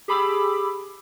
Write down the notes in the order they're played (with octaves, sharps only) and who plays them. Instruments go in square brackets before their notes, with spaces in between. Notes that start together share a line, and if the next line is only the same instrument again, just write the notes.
[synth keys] G4 G#4 B5 D6 E6